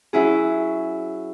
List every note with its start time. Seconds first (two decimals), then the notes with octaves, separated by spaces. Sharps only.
0.13 F#3 C#4 E4 G#4